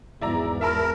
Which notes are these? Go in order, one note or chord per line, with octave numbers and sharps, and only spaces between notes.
E2 G#2 E4 D5 A#5
A#4 E5 A5 B5